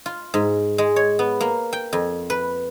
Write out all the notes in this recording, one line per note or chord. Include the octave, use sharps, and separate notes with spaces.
F4
G#2
G#3
C#5
B3
A#3
G5
F2
B4